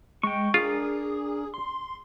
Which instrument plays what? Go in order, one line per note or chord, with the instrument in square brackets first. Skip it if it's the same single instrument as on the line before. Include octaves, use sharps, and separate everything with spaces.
[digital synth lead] G#3 [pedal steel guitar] G5 C#6
[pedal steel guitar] D4 A#4 [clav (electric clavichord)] F4 [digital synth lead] G#4
[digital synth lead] C6